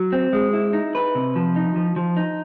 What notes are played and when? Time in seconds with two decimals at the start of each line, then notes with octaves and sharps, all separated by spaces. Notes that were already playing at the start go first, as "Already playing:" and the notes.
Already playing: F#3
0.12 C4
0.33 G#3
0.53 E4
0.73 D#4
0.95 B4
1.15 C3
1.36 F3
1.56 D#4
1.76 F3
1.96 F3
2.17 D#4